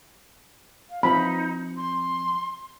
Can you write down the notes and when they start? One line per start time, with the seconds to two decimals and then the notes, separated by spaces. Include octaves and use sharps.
0.89 F5
1.03 F3 C4 D#4 B5
1.77 C6